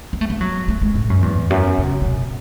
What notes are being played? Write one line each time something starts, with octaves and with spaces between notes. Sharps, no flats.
B3
A3
B3
F#3
A3
G#3
A2
F#2
E2
F#2
C#3
C#3
B2